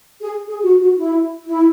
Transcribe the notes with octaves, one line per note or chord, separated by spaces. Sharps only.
G#4
G#4
F#4
F#4
E4
E4